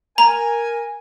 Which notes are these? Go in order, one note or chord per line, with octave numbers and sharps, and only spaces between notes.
A#4 G#5 A#5